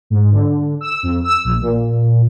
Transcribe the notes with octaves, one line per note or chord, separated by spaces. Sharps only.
G#2
D3
E6
F2
E6
A#1
A#2